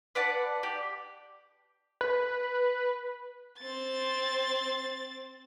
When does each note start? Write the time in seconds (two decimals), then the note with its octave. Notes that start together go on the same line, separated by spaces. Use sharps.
0.15 B4 D5 F#5 A5
0.63 G4 D5
2.01 B4
3.59 C4 A6